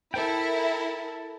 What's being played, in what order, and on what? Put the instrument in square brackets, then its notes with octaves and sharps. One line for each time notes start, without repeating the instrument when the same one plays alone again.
[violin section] E4 A#4 [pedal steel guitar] A4 G5